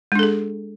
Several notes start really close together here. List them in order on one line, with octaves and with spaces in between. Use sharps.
G#3 D4 A4 G#4